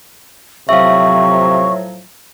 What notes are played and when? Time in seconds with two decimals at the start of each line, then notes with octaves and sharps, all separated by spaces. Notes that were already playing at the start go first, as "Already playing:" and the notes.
0.69 A2 C3 F3 F#3 E5 F5 C#6